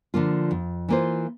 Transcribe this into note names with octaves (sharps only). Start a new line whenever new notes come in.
D3 F3 A#3 F4
F2
E3 A#3 F4 C5